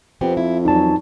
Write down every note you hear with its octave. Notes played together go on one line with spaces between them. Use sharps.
F2 B3 C4 G4
E4
E2 F#3 D#4 A5